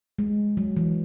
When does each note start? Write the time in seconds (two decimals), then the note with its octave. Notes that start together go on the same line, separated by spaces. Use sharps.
0.19 G#3
0.57 F#3
0.77 E3